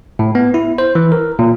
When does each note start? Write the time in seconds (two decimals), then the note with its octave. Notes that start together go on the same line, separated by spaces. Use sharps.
0.19 A2
0.35 B3
0.54 E4
0.78 C5
0.95 E3
1.12 A#4
1.39 A#2